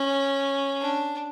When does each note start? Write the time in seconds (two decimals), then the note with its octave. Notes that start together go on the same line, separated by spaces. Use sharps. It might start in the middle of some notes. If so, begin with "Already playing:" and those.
Already playing: C#4
0.81 D4